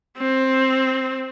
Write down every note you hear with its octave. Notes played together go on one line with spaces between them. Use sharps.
C4